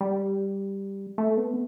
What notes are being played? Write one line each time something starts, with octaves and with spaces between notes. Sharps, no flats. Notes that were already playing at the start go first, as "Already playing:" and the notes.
G3
A3
B3